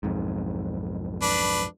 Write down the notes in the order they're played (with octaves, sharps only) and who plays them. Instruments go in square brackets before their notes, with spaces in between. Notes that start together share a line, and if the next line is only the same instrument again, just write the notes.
[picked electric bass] B1 F2 G#2
[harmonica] D4 B4